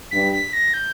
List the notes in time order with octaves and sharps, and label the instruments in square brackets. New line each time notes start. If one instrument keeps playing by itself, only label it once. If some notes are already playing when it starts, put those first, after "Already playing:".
[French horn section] G2 [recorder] B6
[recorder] B6
A#6
G6